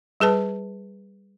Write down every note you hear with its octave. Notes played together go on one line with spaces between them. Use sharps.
G3 G#4 B4 A5